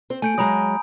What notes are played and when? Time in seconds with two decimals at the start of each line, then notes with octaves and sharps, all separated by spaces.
0.10 C4 C5
0.22 A3 G#5 G6 D7
0.38 F#3 G#3 A#5 B5 D#6